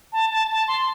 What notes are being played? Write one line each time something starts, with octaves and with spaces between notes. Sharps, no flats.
A5
A5
A5
C6